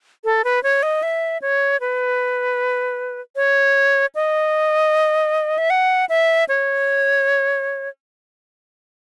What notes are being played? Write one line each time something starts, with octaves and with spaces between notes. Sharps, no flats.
A4
B4
C#5
D#5
E5
C#5
B4
C#5
D#5
E5
F#5
E5
C#5